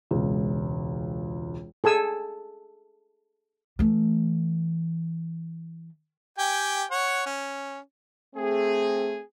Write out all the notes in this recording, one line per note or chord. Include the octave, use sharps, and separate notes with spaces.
E1 C#2
G#4 A4 G#5 E6
E3 A3
G4 G5 G#5
C#5 F#5
C#4
A3 C4 G#4